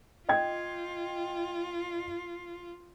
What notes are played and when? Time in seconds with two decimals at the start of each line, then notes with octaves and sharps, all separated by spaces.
0.29 F4 D#5 G5 G#6